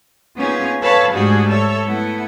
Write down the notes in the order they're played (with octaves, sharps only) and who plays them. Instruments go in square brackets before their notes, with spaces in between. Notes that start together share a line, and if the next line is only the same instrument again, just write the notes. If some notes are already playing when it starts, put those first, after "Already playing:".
[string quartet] A#3 B3 C#4 D#4 F4 G#4
A4 B4 C#5 F5 A5 B5
G#2 G3 A3 D4 F#4 G#4
A4 C#5 E5
A3 B3 E4 A4 F#5